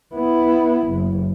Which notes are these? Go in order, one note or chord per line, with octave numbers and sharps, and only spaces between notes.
B3 E4
F#1